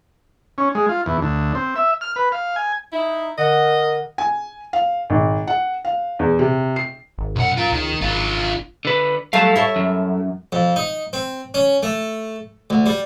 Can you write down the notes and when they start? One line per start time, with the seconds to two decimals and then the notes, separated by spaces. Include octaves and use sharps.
0.58 C#4
0.75 G#3
0.89 F4
1.06 E2
1.22 D2
1.55 C4
1.76 E5
2.01 F6
2.16 B4
2.32 F5
2.56 G#5
2.92 D#4 E4
3.37 D3 A#4 D#5 F#5
4.18 G#5
4.73 F5
5.10 G#1
5.47 F#5
5.85 F5
6.19 E2
6.39 C3
6.76 C7
7.18 G#1
7.36 B1 F#2 F#5
7.57 F4 A#4
7.72 C#2 D#3
8.01 G#1 D4 F4
8.85 D3 B4
9.33 F#3 G3 A3 F5 A5
9.56 E4 A4 C#5
9.76 F#2
10.52 F2
10.76 D#4
11.13 C4
11.54 C#4
11.83 A3
12.70 D2
12.86 G3